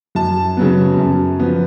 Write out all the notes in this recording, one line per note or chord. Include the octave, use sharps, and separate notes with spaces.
F#2 A5
C#3 F#3 B3
F#2
F3 B3